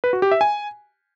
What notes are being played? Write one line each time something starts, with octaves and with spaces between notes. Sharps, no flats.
B4
F#4
G4
E5
G#5